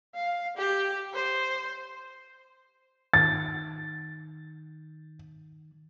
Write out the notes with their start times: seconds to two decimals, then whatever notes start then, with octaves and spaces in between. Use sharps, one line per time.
0.15 F5
0.58 G4
1.14 C5
3.14 D#3 A6